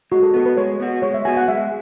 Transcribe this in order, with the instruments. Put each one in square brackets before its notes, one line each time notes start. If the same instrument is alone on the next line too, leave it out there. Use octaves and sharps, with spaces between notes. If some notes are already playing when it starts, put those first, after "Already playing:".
[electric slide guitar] G#3 [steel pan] F#4
[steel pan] A4
[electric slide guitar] B3 F#4 [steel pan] A4
[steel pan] B4
[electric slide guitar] G#3 [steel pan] C#5
[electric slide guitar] B3 F#4
[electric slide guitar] G#3 [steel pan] C#5
[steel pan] E5
[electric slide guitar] B3 F#4 [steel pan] G#5
[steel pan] F#5
[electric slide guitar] G#3 [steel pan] E5